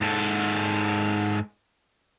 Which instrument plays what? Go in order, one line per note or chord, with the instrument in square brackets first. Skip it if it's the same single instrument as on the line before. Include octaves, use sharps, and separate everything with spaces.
[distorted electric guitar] G#2 A4